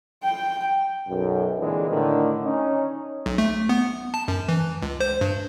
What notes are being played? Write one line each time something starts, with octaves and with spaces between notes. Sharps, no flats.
G5
B1 F#2
A#2 D3 E3 G#3 C4 D4
A2 D3 D#3
C#4 D#4
B1
A3
B3
A5
F#2
E3
C#2
C5
G2